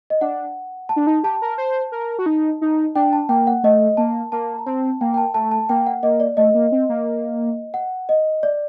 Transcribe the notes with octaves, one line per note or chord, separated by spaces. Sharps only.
D#5
D4 F#5
A5
D4
D#4
G4 A5
A#4
C5
A#4
F#4
D#4
D#4
D4 G5
A5
A#3 G5
F#5
A3 D#5
A#3 A5
A#3 A5
A#5
C4 A5
A#3 G5
G5
A5
A3 A5
A5
A#3 G5
F#5
A#3 D#5
D5
A3 D#5
A#3
C4
A#3
F#5
D#5
D5